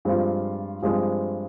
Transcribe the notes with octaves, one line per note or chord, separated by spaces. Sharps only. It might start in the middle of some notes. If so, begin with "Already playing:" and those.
G2 F3 G#3 C4 F4
G2 F3 G#3 C4 F4